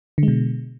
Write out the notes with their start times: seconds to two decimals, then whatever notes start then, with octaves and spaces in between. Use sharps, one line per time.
0.18 D3
0.23 G#3
0.28 B2